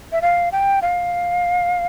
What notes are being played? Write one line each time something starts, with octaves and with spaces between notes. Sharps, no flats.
E5
F5
G5
F5